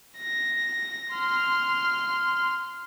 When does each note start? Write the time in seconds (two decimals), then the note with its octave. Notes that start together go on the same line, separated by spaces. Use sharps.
0.17 A#6
1.11 C6 F6